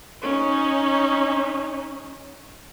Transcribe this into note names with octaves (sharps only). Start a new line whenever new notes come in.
C#4 D#4